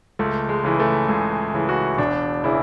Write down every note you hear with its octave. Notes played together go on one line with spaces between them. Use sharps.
C#2 A3
G#3
C#3 E3
A3
C#2 G#4
C#3 E3
F#4
E1 D4
C#3 E3 E4